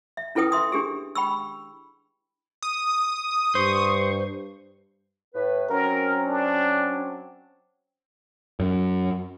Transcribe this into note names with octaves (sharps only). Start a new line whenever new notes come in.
E5
C#4 E4 A4 B4 G5 D#6
E5 C6 D#6
D4 G4 G#4
G5 B5 C#6 E6
D#6
G2 C5 C#6
A2 B4
F#3 C4 C#4 A#4
D4
F#2